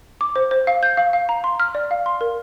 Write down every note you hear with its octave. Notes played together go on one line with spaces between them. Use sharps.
D6
C5
C5
F5
G6
F5
F5
A#5
C6
F6
D5
F5
C6
A#4